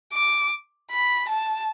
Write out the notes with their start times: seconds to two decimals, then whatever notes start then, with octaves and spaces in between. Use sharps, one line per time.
0.13 D6
0.91 B5
1.29 A5